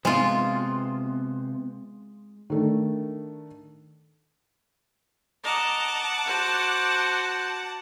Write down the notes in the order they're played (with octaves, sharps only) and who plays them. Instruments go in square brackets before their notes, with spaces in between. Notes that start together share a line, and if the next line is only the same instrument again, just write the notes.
[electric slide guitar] C3 B3 C5 [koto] G#3 F4
[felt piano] D#3 A3 D4
[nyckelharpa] D#5 A#5 [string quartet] F#5 A5 D6
[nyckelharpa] F#4 C5